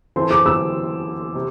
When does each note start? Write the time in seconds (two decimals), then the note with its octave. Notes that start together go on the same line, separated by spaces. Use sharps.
0.16 E3 C4 A4 C5 C6
0.31 D6
0.46 E6
1.35 C3